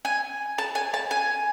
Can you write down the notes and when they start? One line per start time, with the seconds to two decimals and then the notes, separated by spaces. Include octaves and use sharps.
0.05 G#5
0.58 A5
0.75 G#5
0.94 A5
1.11 G#5